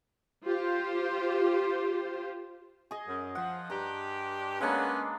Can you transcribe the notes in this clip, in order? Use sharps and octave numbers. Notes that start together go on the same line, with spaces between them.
F4 G4 C5
G#4 D#5
F#2
F3 F#5
G2 G4 A#5
G#3 A#3 B3 C#4 D4